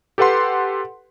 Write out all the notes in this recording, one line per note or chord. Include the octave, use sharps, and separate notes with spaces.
G4 A4 B4 F#5 C6